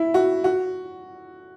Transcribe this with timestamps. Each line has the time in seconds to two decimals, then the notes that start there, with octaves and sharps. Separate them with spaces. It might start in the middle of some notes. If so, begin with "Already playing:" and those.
Already playing: E4
0.14 F#4
0.44 F#4